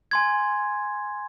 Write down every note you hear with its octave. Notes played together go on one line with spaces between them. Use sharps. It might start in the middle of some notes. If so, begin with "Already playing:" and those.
G#5 C6 G#6